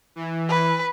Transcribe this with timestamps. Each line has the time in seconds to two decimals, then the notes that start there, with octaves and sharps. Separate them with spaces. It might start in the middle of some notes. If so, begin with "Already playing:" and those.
0.16 E3
0.49 B4